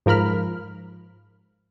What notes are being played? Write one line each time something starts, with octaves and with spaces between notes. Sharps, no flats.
G#2 F3 A#4 B5 F6